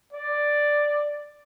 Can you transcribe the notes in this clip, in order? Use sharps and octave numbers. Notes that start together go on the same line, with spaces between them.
D5